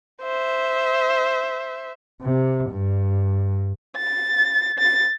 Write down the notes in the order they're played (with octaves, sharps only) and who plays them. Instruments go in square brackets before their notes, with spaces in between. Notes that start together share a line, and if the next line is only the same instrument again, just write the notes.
[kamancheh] C5 E5
[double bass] C3
G2
[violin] A6
A6